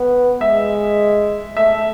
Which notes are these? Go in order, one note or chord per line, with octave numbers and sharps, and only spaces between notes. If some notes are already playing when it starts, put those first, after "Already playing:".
Already playing: B3
G#3 E5
A3 E5